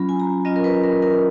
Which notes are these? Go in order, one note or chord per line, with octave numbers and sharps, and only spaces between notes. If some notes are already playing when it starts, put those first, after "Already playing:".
Already playing: F#3 C#4 F4 B5
G#5
A#5
F#3 C#4 F4 D#5
A#4
B4
A#4
A#4